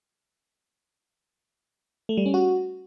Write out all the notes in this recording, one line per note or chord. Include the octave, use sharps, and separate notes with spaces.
A3
G3
C#4
F#4